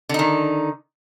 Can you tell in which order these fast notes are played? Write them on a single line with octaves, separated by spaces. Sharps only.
D3 D#4 D#3